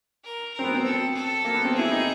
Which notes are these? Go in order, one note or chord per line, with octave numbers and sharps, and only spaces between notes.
A#4
C4 A#4
B3
C4
A4
A4
A#3
B3
C4
E4 G#4
D#4